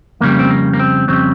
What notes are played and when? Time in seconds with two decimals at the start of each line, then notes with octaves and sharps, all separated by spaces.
0.20 F2 C#3 G3 A#3
0.39 C4
0.50 A#3
0.73 A#3
0.79 C4
1.08 F2 C#3 G3 C4